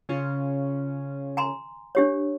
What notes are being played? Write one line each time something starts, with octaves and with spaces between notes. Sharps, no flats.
C#3 C#4 F4
G#5 A#5 C6
D4 G4 C#5